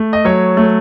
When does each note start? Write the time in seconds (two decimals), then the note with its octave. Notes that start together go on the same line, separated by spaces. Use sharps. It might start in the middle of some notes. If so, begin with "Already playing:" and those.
Already playing: A3
0.13 D#5
0.25 F#3 C#5
0.57 A3